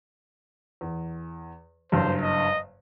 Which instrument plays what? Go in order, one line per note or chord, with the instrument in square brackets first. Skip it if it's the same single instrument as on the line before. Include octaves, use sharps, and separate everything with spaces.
[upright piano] E2
[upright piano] F#1 G2 [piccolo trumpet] C5
[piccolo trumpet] D#5